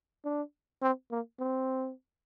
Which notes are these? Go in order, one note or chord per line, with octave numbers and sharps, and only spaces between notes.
D4
C4
A#3
C4